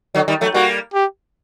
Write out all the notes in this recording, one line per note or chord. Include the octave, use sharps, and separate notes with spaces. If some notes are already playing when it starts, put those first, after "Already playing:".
D3 F#3
D#3 G3
F#3 A3
G3 A#3 F#4
G4